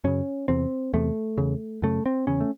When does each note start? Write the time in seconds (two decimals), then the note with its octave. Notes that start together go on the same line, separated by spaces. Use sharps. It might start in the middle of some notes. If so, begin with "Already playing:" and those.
0.04 F#2 C#3 C#4
0.48 E2 C3 C4
0.94 E2 C3 A3
1.38 E2 C#3
1.82 F#2 C#3 A3
2.06 C4
2.27 E2 C#3 C#4
2.40 A3